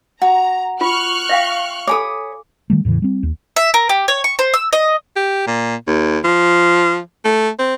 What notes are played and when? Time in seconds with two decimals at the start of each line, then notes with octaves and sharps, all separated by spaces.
0.22 F#4 A#5
0.81 F4 C#6 F6 F#6
1.29 E5 F5 G5
1.87 A4 C#5 G#5 B5 D6 D#6
2.70 D#3 G3 A3
2.85 E2 A2 C#3 E3
3.02 G3 C4
3.23 D#2
3.56 E5
3.74 A#4
3.89 G4
4.08 C#5
4.24 C#6
4.39 C5
4.54 E6
4.73 D#5
5.16 G4
5.47 A#2
5.87 D#2
6.24 F3
7.25 A3
7.59 C4